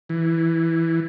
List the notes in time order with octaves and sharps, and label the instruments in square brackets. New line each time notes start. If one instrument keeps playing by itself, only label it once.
[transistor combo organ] E3